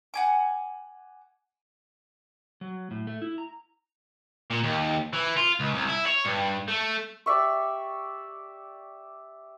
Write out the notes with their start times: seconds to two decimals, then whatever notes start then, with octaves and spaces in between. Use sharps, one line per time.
0.14 F#5 G#5 D6
2.61 F#3
2.91 A2
3.07 A3
3.22 E4
3.38 A#5
4.51 A#2
4.63 D#2
5.13 E3
5.37 F4
5.60 C#2
5.74 C2
5.89 E4
6.07 C#5
6.26 G2
6.68 A3
7.26 G4 D5 E5 C#6